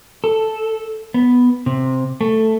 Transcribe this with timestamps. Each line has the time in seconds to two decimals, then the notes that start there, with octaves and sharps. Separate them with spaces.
0.24 A4
1.14 B3
1.66 C3
2.21 A3